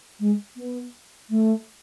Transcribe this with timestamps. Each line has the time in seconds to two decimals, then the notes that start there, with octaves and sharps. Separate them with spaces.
0.20 G#3
0.56 B3
1.30 A3